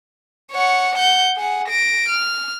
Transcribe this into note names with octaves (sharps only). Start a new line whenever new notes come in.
C#5 F#5
F#5 G6
G#4 F#5
A#6 D7
F6